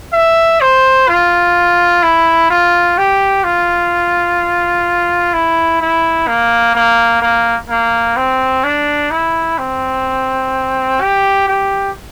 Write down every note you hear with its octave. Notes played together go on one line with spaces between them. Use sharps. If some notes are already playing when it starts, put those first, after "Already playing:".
E5
C5
F4
E4
F4
G4
F4
E4
E4
A#3
A#3
A#3
A#3
C4
D4
E4
C4
G4
G4